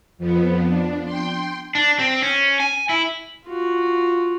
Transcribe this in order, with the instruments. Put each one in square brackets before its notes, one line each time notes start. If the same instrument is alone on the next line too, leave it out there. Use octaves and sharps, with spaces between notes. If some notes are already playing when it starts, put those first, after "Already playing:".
[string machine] F2 F3 B3
D4
G5 C6
[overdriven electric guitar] D4
C4
C#4
G#5
E4
[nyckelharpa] F4 F#4